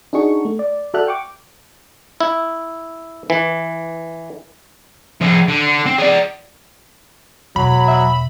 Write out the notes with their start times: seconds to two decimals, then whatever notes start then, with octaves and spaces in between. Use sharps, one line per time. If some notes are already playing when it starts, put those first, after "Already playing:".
0.13 D4 D#4 F#4 G#4 C#6
0.45 A3
0.59 D5
0.94 F#4 A4 D5 E5 F6 F#6
1.07 G5 C#6 D6
2.21 E4
3.30 E3
5.21 F3 G#4
5.48 D3
5.86 C4
5.98 G#4 D5
7.56 E1 F#3 B5
7.87 E5